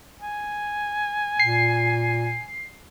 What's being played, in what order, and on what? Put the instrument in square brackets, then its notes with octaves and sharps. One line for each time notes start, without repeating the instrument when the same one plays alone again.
[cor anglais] G#5
[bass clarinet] A#2 [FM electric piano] C7